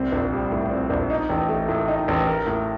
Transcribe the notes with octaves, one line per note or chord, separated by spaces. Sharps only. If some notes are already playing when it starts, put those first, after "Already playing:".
Already playing: C2 C4
A#1
G3
A2
C4
A#1
D#4
A1
A3
A2
D#4
A1
A#4
A2